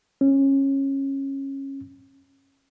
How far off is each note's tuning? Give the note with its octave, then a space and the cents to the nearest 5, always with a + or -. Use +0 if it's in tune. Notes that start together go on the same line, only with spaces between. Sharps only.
C#4 -20